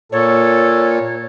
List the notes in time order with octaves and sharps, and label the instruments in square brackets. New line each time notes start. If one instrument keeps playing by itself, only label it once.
[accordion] A#2 [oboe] A4 [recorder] C#5